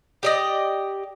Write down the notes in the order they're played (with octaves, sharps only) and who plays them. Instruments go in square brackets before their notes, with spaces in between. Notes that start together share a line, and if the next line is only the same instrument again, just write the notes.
[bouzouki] G4 D5 D#5